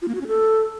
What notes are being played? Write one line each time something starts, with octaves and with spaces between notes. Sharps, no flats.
F4
A#3
F#4
C#4
A4